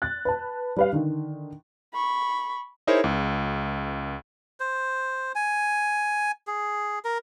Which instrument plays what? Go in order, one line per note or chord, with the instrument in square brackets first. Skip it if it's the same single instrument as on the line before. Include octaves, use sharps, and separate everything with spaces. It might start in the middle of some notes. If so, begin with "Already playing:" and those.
[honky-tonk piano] F#6 A6
B4 A5
G3 B4 F5
D3 D#3
[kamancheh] B5 C#6
[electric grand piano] D#4 E4 G#4 A#4 C5 C#5
C#2
[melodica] C5
G#5
G#4
A#4